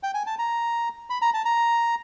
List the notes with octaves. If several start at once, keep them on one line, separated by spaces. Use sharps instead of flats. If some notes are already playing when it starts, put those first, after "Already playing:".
G5
G#5
A5
A#5
B5
A#5
A5
A#5